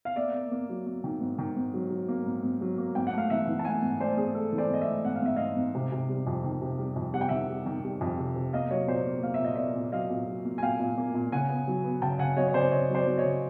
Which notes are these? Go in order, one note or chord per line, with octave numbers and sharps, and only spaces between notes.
F5
A#3 D5 E5
A#3
A#3
F#3
A#3
D#3
G#2
D#3
G#2
F#3
F#3
A#3
G#2
G#2
F#3
A#3
G#2 G5
F#5
A3 F5
E3 E5 F#5
E3
A5
A3 F#5 G#5
G#2
A3 C5 D5
G#2 G#4
A3 A4
E3
C5 D5
G#2 D#5
D5 E5
A3
G#2 F#5
F5
G#2 E5
G#2 D#5 F5
G#2
C3
C3
G3
F2
D#3
C3
G3
F2
G3 F#5
G5
D#3 E5 F#5
G3
D#3
G3
F2
C3
C3
A#3 D#5 F5
F#3 C#5 D#5
A#2 C5 D5
A#3
A#3 F5
E5
A#2 D#5
A#3 D5 E5
A#2
F#3 D#5 F5
A#2
F#3
A#3
G#5
A#2 F5 G5
A#2
A#3
A#2
C#3 F#5 G#5
B3
F#3
B3
C#3 G5 A5
C#3 F#5 G#5
F#3 C#5 D#5
C#5
C#3 C5 D5
C#3 C#5 D#5
F#3
C5 D5
F#3
C#5 D#5
C#3